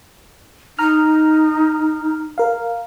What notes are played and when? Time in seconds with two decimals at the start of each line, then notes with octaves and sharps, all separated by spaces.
0.79 D#4 A#5 F6
2.38 A#4 F5